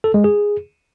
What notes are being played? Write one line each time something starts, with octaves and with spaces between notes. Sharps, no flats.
A4
G#3
G#4